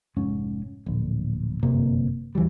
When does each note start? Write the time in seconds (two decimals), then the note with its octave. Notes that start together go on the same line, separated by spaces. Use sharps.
0.17 F1 G#2 C#4
0.86 D1 A#1
1.63 G1 F#2 C3 A#3
2.35 D#2 E3 F#3 G3